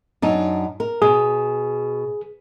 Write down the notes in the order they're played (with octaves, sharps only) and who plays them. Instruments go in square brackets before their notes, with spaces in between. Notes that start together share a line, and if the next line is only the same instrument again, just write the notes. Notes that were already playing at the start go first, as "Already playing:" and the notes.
[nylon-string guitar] F#2 D4 D#4
A#4
[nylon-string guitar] B2 [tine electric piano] G#4